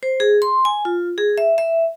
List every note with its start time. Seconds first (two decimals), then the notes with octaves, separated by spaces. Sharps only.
0.03 C5
0.20 G#4
0.42 C6
0.65 G#5
0.85 F4
1.18 G#4
1.38 E5
1.58 E5